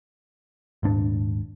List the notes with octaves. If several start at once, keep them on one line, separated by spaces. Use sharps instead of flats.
D#1 G#2 D4